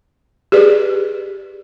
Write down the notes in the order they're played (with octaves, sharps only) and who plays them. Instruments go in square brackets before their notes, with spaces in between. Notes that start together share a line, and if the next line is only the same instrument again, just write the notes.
[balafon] G4 G#4 B4 D5